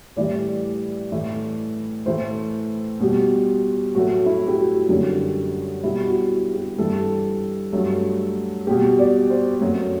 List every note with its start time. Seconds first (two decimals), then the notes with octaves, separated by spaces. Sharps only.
0.16 A2 E3 G3 D5
1.12 A2 E3 A3
2.06 A2 E3 A3 C5
3.00 B2 G3
3.95 A2 F#3 A3 F#4
4.26 E4
4.48 G4
4.58 F#4
4.89 F#2 D3 G3
5.83 B2 G3 E4
6.07 F#4
6.55 G4
6.78 G2 E3 G3 A4
7.72 G2 F#3 A3
8.67 B2 G3 G4
8.99 D5
9.30 C5
9.61 F#2 F#3 A3